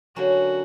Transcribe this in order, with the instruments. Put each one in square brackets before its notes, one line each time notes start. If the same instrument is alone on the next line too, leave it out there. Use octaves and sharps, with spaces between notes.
[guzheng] D3 F#3 A#3 C#4 [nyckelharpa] F#4